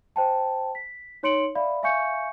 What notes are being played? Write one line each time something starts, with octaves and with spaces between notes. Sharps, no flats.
C5 G5 A5
B6
D#4 C#5 C6 C#7 D7 F#7
D5 E5 F5 B5
E5 F5 G#5 C#6 G6 C#7